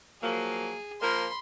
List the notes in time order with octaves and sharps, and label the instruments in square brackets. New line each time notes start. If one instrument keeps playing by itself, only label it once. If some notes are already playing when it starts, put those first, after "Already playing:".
[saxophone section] F3 F#3 A#3 [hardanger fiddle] G#4
[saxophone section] F3 A#3 A#4 [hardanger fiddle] B5 C6